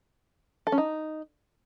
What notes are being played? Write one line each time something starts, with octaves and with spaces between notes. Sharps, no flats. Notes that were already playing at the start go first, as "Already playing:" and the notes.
A4
C#4
D#4